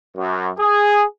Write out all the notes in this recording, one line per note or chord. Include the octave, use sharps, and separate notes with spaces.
F#2
G#4